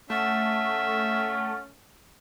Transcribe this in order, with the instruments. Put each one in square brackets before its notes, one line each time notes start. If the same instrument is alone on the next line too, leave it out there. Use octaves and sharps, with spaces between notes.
[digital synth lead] A3 [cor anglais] C#4 [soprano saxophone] E5 [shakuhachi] F#5